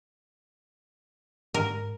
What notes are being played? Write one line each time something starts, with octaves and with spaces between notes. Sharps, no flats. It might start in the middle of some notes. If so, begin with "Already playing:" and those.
G#2 A#4